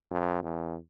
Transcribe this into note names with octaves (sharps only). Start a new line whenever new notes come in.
F2
E2